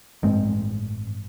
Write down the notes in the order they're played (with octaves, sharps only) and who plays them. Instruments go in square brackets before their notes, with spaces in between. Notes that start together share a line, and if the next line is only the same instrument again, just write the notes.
[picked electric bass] A1 G2 G#3 C4